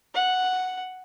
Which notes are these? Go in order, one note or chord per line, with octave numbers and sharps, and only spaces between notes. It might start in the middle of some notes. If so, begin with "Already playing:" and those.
F#5